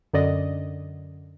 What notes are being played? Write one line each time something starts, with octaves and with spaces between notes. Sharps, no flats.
F#2 D3 D5 D#5